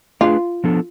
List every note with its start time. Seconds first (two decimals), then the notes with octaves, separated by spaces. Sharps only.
0.21 A3 D4 F4 G#4 B4
0.64 F3 B3 D4 A4